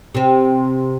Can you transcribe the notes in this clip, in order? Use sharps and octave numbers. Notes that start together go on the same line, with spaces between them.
C3 C4